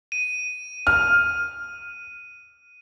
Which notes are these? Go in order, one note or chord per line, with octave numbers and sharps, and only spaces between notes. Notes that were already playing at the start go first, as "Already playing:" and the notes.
D#7
F6